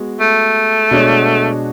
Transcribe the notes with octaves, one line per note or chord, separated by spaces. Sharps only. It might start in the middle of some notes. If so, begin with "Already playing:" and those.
Already playing: G#3 B3 F#4
A3
B2 G#3 D4 F#4 C#5